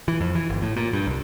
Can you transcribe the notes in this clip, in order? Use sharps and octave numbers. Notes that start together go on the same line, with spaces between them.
E3
F2
E3
G1
A2
A#2
G2
C2